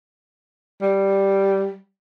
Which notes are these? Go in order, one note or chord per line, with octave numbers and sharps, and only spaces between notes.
G3